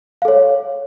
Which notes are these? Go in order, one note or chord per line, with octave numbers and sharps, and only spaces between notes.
A4 C#5 F5